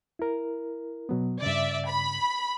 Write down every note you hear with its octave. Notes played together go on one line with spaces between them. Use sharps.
E4 A#4
B2 F#3 B3
G2 C#3 D5 E5
B5